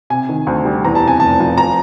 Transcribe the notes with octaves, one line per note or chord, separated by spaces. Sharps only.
C3 G#5
D#3
D2
G3
E2 A#5
A5
C3
G#5
F1 A5
F3
A#5